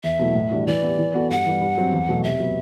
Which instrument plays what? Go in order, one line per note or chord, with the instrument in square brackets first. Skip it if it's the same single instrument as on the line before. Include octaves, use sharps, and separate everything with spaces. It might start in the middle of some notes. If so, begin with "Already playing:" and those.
[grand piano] E2 [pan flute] E5
[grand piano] B2 F#3 A3 E4
A2
E3 G3 D4 F#4
[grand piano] E3 [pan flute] D5
[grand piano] B3 E4 G4
E3
B3 F#4 A4
[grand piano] G2 [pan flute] F#5
[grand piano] E3 G3
G2
F#3 C4
E2
B2 F#3 A3
[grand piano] C3 [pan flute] E5
[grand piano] F#3 B3